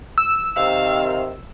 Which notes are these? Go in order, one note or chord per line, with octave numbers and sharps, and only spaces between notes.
E6
C3 D#3 F5